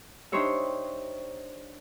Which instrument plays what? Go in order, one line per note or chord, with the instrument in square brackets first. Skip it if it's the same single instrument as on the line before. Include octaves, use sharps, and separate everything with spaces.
[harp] D4 D#4 G4 C5 C#5 E5